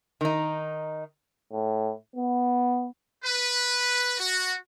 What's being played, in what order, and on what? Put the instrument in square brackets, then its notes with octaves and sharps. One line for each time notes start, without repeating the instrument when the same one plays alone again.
[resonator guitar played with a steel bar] D#3 D#4
[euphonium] A2
B3
[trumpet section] B4
F#4